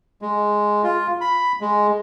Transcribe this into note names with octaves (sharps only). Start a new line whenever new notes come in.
G#3
F4
B5
G#3